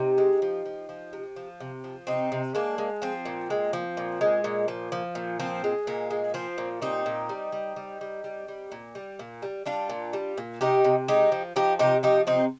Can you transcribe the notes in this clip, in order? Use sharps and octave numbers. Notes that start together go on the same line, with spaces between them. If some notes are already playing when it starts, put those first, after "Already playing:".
Already playing: C3 D#4 G4
G#3
F3
F3
F3
C3
F3
C3
F3
C3 C4 D#4
C3
G#3 A#3 D4
G#3
F3 C4
A#2
G#3
F3
A#2
G#3
A#2
F3
F3
A#2
F3 C4
G#3
A#2 A#3
G#3
F3 C4
A#2
G3 C4 D#4
A#2
G3
G3
G3
G3
G3
G3
A#2
G3
A#2
G3
G3 D4 F4
A#2
G3
A#2
C3 D#4 G4
C3
G#3 D#4 G4
F3
F3 D#4 G4
C3 D#4 G4
F3 D#4 G4
C3 C4 D#4